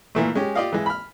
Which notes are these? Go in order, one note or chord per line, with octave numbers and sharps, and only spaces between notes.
A#2 E3 A3
G#3 C#4 G4
F4 G4 D5 D#5 F5
E3 G#3
B5 F6